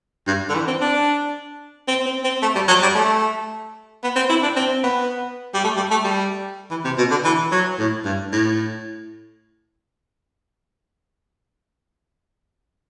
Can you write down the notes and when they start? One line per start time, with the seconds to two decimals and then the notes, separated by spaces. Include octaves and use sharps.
0.27 G2
0.49 D3
0.54 E3
0.68 C4
0.81 D4
1.88 C4
2.06 C4
2.24 C4
2.42 A3
2.55 G3
2.68 F#3
2.82 G3
2.95 A3
4.03 B3
4.16 C4
4.29 E4
4.43 D4
4.56 C4
4.84 B3
5.54 G3
5.64 A3
5.77 G3
5.91 A3
6.04 G3
6.71 E3
6.85 C3
6.98 B2
7.11 D3
7.25 E3
7.52 F#3
7.79 A2
8.05 G2
8.33 A2